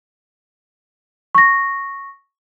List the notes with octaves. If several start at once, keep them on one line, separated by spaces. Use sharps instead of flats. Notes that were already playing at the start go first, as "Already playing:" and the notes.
C#6 A#6